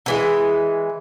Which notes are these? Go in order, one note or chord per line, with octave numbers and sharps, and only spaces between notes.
D3 E3 G#3